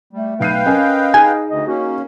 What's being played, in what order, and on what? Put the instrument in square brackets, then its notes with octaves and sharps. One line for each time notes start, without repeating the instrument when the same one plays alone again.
[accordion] G3 [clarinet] A3
[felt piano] B1 C7 D#7 [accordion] B4 F5 G5
[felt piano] C#4 A#4 G#5 [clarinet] D#5
[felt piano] D#4 G#4 [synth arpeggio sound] G#5
[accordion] D2 [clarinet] D#5
[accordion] A#3 C#4 [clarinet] F#4